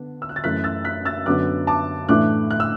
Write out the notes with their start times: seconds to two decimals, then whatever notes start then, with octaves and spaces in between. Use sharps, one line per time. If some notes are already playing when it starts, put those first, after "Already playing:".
Already playing: D3 B3 D4
0.22 E6
0.29 F#6
0.36 A6
0.44 F#2 E3 A3 F#6 B6
0.64 E6 A6
0.85 F#6 B6
1.05 E6 A6
1.26 F#2 D3 F#3 B3 D4 D6 F#6
1.67 A5 D6
2.09 A2 E3 A3 D4 D6 F#6
2.51 F#6
2.60 E6